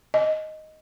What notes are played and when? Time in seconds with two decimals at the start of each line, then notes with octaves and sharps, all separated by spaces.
0.14 D#5